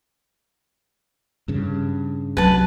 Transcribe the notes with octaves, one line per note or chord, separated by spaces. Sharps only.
G2 C#3
C2 F#3 B4 A5